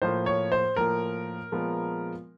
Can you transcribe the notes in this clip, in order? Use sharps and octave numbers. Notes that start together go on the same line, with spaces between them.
A2 F3 A#3 C5
C#5
C5
A2 F3 A#3 A#4
A#2 F3 G#3 B3